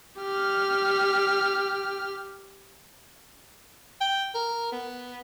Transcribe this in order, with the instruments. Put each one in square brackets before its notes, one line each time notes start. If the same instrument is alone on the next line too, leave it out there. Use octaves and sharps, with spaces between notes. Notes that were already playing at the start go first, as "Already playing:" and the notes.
[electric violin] G4 F6
[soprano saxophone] G5
A#4
B3